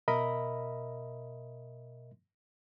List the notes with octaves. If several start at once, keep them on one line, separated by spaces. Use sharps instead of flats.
B2 A#4 D#5 E5 B5